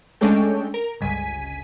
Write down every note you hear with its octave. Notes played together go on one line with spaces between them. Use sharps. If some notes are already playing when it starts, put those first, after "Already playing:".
G#3 A3 C#4 D4 A4 G5
A#4
G1 C#2 G#5 B6 D#7